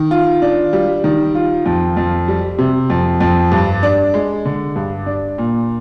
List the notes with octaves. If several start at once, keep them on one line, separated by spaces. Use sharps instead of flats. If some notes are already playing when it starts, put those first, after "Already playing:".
Already playing: D#3
F4
D4
G3
D#3
F4
F2
F2
G3
C3
F2
F2
G2
D4
G#3
D3
G2
D4
A#2